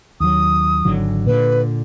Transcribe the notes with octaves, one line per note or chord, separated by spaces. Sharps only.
D#2 F#3 D#6
G#1 D3 F#3
A#2 D3 B4